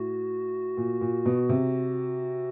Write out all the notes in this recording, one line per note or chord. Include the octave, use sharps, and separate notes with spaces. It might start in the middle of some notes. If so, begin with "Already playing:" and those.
Already playing: A2 F#4
A#2
A#2
B2
C3